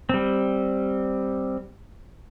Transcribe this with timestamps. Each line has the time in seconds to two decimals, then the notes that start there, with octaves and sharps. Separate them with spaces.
0.09 G3 C4